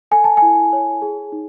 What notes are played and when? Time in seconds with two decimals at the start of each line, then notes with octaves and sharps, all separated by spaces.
0.11 A4 G#5
0.24 A5
0.37 E4 G#5
0.73 C#5
1.02 G#4
1.32 D#4